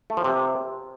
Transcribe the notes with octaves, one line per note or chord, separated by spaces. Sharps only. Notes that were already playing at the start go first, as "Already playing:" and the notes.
A3
F3
C3